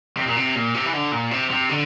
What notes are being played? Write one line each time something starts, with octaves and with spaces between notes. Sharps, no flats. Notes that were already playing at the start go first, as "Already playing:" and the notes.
C3
A#2
C3
A#2
C3
E3
D3
A#2
C3
C3
D3